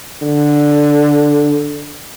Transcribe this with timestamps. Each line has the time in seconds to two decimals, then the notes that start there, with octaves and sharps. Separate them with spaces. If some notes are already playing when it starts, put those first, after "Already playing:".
0.22 D3